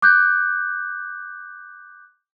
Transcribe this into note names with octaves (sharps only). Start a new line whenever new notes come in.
D6 F#6 G6